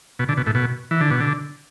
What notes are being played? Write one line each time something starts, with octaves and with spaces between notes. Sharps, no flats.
B2
D3
B2
A2
B2
E3
D3
B2
D3